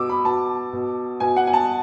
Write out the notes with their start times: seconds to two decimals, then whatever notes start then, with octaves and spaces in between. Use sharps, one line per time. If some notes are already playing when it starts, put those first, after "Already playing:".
Already playing: B2 D6 E6
0.09 B5
0.25 B2 A5
0.73 B2
1.20 B2 G#5
1.36 F#5
1.47 G#5
1.53 A5